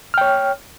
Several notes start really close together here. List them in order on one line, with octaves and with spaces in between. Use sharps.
F6 G5 C#5